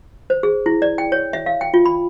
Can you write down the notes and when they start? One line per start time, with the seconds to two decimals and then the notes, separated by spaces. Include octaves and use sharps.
0.30 C5
0.43 G#4
0.66 E4
0.82 D5
0.98 G5
1.12 C#5
1.33 E5
1.46 F5
1.61 G5
1.74 F4
1.85 B5